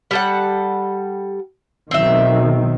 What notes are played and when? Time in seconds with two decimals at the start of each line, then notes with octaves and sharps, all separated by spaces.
0.11 G3 A4 F#5
1.91 B1 D#3 C4 E5